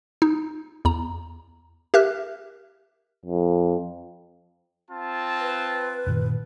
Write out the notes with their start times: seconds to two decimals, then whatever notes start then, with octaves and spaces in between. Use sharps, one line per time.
0.22 D#4
0.85 E2 A#5
1.94 G4 A#4 E5 F6 F#6
3.25 F2
4.89 C4 F4 A5
5.41 B4
6.07 F#2 A#2 D#3